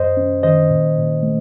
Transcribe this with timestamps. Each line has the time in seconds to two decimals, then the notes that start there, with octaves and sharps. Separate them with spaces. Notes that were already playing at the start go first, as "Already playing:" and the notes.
Already playing: F#2 C5 D#5
0.17 C#4
0.43 D#3 C5 D#5
0.70 A#2
0.97 A#2
1.23 A3